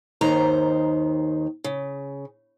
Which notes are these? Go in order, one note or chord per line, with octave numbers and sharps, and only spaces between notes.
D#2 D#3 C5 A#5
C#3